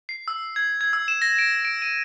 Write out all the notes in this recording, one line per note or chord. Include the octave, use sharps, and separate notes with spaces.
C7
E6
G#6
G#6
E6
E7
A#6
D7
D7
D#7